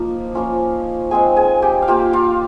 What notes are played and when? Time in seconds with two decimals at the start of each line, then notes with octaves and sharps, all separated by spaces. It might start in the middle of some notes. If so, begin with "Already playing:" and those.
Already playing: F3 A#3 D#4
0.35 F3 A#3 C#4 F4
1.11 G#3 C4 D#4 G#4 G#5
1.36 G#4 G#5
1.62 G4 G5
1.82 F5
1.88 A#3 F4 G4 G5
2.13 F4 F5